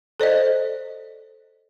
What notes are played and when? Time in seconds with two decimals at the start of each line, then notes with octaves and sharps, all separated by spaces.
0.20 A4 C5 D5 D#5